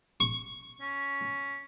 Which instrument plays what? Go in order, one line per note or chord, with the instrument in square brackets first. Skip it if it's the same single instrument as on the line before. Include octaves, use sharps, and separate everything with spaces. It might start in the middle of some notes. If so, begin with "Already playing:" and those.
[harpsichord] C#6
[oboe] C#4